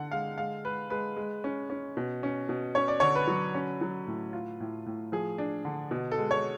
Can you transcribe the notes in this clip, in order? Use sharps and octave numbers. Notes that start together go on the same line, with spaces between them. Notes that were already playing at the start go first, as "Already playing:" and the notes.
Already playing: D3 D4 F#5
G#3 F5
G#3 F5
G#3 B4
G#3 B4
G#3
C#4
C#4
B2
C#4
B2
C#4 C#5
D5
D3 C#5
B4
F#3
C#4
F#3
A2
F4
A2
A2
F3 G#4
D4
D3
B2
A4
G#3
C#5